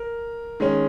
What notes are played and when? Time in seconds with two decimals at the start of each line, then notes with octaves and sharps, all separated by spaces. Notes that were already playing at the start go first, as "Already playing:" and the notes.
Already playing: A#4
0.60 D#3 G#3 C#4